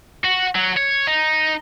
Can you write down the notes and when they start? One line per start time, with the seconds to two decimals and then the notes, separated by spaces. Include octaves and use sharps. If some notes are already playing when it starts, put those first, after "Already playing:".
0.24 F#4
0.55 F#3
0.77 C#5
1.08 D#4